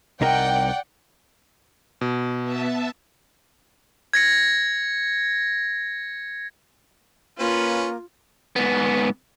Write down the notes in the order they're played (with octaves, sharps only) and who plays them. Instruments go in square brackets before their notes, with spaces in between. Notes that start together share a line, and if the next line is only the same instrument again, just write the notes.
[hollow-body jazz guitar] C2 D#4 A#4 [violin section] D5 F#5 G5
[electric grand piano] B2
[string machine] B3 E5 A5
[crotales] G#6 A#6 C#7
[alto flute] A#3 [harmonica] C#4 B4 [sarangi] F4
[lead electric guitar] G#2 B3